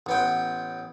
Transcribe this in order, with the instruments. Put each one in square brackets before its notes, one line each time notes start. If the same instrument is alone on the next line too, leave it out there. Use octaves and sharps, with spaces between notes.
[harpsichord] A1 B3 G5